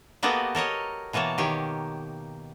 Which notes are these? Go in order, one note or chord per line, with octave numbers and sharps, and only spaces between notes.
A#3 B3 F#4 G4 A4 D#5
A4 A#4 C#5 D#5
B2 E3 A#3 C#5 A5
D#3 G4 C#5